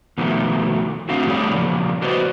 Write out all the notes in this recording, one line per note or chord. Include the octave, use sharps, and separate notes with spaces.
B2 D#3 F3 A3
F#3 A3 C4 D4 F5
A2 G3 C#4 G#4 D5
A2 C#3 E3 F3 A#3
F#4 B4 C5 D5 D#5